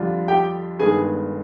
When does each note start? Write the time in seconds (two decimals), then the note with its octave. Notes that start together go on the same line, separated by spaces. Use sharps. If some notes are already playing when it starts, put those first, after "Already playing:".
Already playing: F2 D3 G3 D4 F4
0.28 G4 G5
0.79 G1 G2 D#3 G#3 B3 G#4 G#5